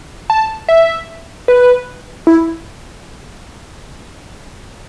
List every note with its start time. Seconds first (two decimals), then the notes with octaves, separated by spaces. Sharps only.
0.30 A5
0.68 E5
1.48 B4
2.27 E4